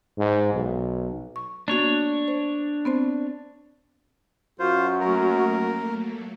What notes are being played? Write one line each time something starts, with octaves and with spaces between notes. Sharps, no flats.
G#2
B1
C#6
A#3 B3 D4 F#4 C#5
C5
B3 C4 C5
F#2 F4 F#4 C5
F#3 A3 A#3 A#4